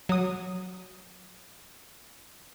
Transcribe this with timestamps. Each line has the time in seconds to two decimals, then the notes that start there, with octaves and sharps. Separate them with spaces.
0.09 F#3 D#6